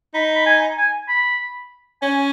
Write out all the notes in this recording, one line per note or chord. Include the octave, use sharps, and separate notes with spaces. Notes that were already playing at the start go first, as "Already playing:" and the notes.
D#4 B5
B5
G#5
G#5
B5
C#4 G#5